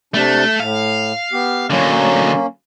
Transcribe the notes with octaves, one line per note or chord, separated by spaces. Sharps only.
C3 A3 D4
A2 F5
B3 G4
D3 F#3 A#3 C#4